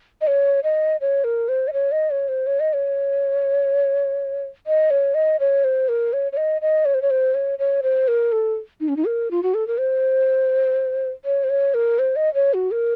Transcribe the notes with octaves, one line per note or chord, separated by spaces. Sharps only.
D#5
C#5
D#5
C#5
A#4
C5
D#5
C#5
D#5
C#5
C5
C#5
D#5
C#5
D#5
C#5
D#5
C#5
C5
A#4
C#5
C#5
D#5
D#5
C#5
C5
C#5
C5
C#5
C#5
C5
A#4
A4
D#4
C#4
D#4
A#4
F4
F#4
A4
A#4
C5
C#5
C5
C#5
A#4
C5
D#5
C#5
F#4
A#4